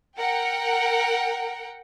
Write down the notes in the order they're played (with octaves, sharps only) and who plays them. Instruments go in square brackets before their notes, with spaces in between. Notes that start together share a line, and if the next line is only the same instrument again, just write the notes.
[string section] A#4 F#5 G5